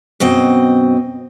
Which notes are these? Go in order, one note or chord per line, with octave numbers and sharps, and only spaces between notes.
F#2 B2 C4 D#5